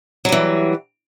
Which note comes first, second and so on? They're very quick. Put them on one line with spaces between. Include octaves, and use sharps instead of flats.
F#3 G3 E3